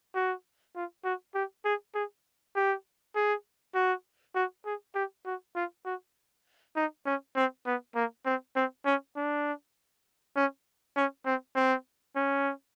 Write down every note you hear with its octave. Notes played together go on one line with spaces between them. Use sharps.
F#4
F4
F#4
G4
G#4
G#4
G4
G#4
F#4
F#4
G#4
G4
F#4
F4
F#4
D#4
C#4
C4
B3
A#3
C4
C4
C#4
D4
C#4
C#4
C4
C4
C#4